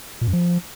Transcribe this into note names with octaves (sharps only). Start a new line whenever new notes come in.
A#2
F#2
F3